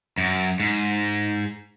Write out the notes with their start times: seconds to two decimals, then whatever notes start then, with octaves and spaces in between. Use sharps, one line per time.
0.18 F#2
0.60 G#2